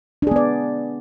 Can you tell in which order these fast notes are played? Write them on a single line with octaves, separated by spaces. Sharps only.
D4 G#4 B3 D5